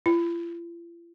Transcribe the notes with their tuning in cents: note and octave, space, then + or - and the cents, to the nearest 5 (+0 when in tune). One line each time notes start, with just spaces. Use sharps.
F4 -45